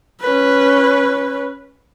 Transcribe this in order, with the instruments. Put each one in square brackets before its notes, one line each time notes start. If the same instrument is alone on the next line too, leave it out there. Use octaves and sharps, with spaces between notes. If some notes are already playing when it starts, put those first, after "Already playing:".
[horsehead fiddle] C#4 B4